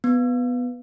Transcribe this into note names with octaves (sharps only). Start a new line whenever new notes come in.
B3